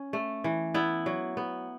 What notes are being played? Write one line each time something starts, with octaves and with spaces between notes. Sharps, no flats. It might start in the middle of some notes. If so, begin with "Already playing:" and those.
Already playing: C#4
A3
E3
B3 E4
F#3
B3